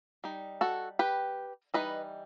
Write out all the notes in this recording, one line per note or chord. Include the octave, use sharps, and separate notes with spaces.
G3 D#4
F#4 A4
G4 B4
E3 G3 D#4 B4 D#5